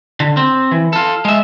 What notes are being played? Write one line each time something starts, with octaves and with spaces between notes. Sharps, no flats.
D3
C4
E3
F4 A4
G#3 E5